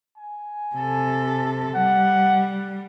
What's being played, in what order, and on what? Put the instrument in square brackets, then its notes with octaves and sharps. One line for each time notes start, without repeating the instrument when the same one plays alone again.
[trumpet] G#5
[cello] C3 A4
[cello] G3 [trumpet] F#5